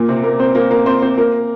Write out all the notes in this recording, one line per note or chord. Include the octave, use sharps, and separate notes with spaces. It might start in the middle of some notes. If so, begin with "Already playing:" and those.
Already playing: A#2 A#3
C3 C4
A#3 A#4
C4 C5
A#3 A#4
A#3 A#4
C4 C5
C4 C5
A#3 A#4